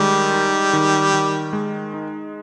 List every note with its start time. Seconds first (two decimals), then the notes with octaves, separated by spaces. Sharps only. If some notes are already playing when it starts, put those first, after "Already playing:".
Already playing: D#3 G3 G#3
0.33 D#4
0.73 D#3
1.14 D#3
1.53 G#3
1.94 D#4